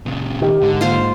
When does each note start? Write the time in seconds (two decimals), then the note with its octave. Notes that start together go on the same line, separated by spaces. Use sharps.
0.06 A#2 C#3
0.42 D#3 G4
0.62 G#2 D3
0.81 A#3 F4 C5 F5